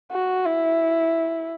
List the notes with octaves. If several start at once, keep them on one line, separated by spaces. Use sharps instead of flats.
F#4
E4